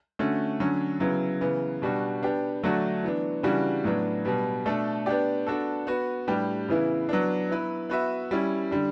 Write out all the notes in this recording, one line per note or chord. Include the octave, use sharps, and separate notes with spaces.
D3 A3 C#4 F#4
D3 F#3 C#4
C#3 F#3 B3 E4
C#3 E3 B3
B2 G3 D4 F#4
B3 D4 G4
D3 F#3 A3 D4 F#4
E3 B3 D4
C#3 E3 G3 D4 F#4
A2 F#3 B3 D4
B2 G3 B3
B2 A3 D4 A4
B3 D4 G4 D5
B3 D4 F#4 A4
B3 F#4 B4
A2 G3 D4 G4 B4
C#3 E3 B3 E4
F#3 B3 D4
B3 E4 B4
B3 F#4 B4 E5
G3 C#4 E4
D3 G3 D4